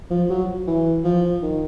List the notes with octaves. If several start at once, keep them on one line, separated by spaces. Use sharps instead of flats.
F3
F#3
E3
F3
D#3